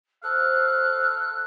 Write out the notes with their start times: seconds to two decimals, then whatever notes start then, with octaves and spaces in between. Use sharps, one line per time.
0.23 A4 C5 F5 F#6